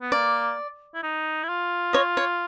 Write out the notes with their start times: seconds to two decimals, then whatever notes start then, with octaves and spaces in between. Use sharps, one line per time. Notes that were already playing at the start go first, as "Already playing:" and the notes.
0.01 B3
0.12 A#3 D5
0.95 E4
1.03 D#4
1.44 E4
1.49 F4
1.93 C#5 D#5
2.17 C#5